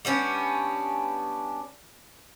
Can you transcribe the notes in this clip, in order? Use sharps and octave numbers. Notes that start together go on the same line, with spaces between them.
G3 B3 C#4 D4